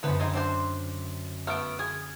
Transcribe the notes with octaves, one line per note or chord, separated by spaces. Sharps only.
F#2 D3 B3 B4 C5
C4 D#4 G#4
C4 D4 C5
A3 B3 F6 D7
G#4 D#6 G#6